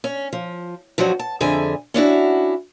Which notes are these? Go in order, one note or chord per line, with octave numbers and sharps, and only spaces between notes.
C#4
F3
G2 F3 F#3 C#4 F#4
A5
F2 D3 G#4 E5 G#5
C#4 D4 E4 F#4